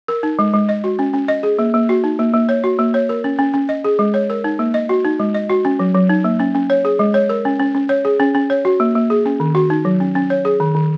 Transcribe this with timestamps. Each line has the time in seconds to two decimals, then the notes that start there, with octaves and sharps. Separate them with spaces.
0.08 A#4
0.23 D#4
0.39 G#3
0.53 G#3
0.69 D#5
0.84 F#4
0.99 C#4
1.14 C#4
1.28 D#5
1.43 G#4
1.59 A#3
1.74 A#3
1.89 F#4
2.04 D#4
2.19 A#3
2.34 A#3
2.49 C#5
2.64 F#4
2.79 A#3
2.94 C#5
3.09 A#4
3.24 C#4
3.39 C#4
3.54 C#4
3.69 D#5
3.84 G#4
3.99 G#3
4.14 C#5
4.30 A#4
4.44 D#4
4.59 A#3
4.74 D#5
4.89 F#4
5.05 D#4
5.20 G#3
5.34 D#5
5.49 F#4
5.65 C#4
5.79 F#3
5.94 F#3
6.09 D#4
6.24 A#3
6.40 C#4
6.55 C#4
6.70 C#5
6.85 G#4
6.99 G#3
7.14 C#5
7.29 A#4
7.45 C#4
7.59 C#4
7.75 C#4
7.89 C#5
8.05 G#4
8.20 C#4
8.35 C#4
8.50 C#5
8.65 F#4
8.80 A#3
8.95 A#3
9.10 G#4
9.26 C#4
9.40 D#3
9.55 F#4
9.70 D#4
9.85 F#3
10.00 C#4
10.15 C#4
10.30 C#5
10.45 G#4
10.60 D#3
10.75 D#3